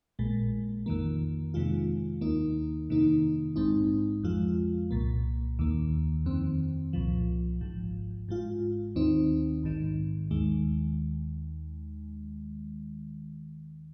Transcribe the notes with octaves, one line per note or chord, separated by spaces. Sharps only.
A#1 A#2 G#3
F2 D#3 A#3
F2 C3 D#3 G#3 F4
D#2 D#3 A#3 D#4
F2 C3 D#3 A#3 D#4
A#1 G#2 G#3 C4 D#4
F2 F3 G#3 F4
C2 A#2 A#3
D#2 D#3 A#3
F2 D#3 C4
C2 A#2 F3
G#1 G#2 F3
G#2 G#3 F4
D#2 D#3 C4 D#4
A#1 G#2 D#3
D#2 D#3 G#3